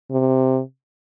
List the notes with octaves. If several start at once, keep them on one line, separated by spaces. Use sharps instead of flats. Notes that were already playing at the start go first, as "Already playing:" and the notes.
C3